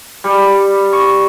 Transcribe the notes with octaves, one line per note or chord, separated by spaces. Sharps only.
G3
C#6